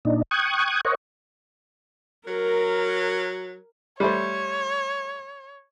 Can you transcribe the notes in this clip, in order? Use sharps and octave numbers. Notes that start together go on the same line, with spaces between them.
A#2 D4 D#4
G5 C#6 D#6 F#6 G#6
A#4 C5 C#5 D#5 F#5 C#6
F#3 A#4
G3 A3 C5 C#5